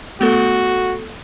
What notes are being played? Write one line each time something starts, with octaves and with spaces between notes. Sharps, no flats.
A3 B3 F#4 A4